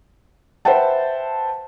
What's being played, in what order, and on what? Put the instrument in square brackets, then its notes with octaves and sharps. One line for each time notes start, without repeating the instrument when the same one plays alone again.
[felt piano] B4 C5 E5 F#5 G5 A5